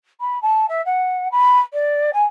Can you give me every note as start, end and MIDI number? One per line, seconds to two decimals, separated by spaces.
0.20 0.41 83
0.42 0.66 81
0.69 0.82 76
0.86 1.30 78
1.31 1.60 83
1.73 2.11 74
2.13 2.24 80